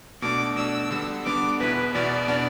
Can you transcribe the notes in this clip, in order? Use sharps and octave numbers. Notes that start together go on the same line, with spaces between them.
B2 A3 D4 D6
B2 A3 D4 E6
D3 G3 B3 D4
D3 G3 B3 D4 D6
E2 B2 B3 E4 B4
E2 B2 B3 E4 D5
B2 B3 D4